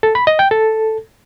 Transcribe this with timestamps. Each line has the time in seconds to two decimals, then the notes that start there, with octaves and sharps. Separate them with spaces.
0.03 A4
0.15 B5
0.27 D#5
0.39 G5
0.51 A4